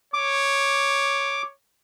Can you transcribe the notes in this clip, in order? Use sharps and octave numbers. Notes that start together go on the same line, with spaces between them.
C#5 D6